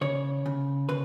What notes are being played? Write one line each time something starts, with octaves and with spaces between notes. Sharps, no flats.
C#3 C#5
C#3
C#3 B4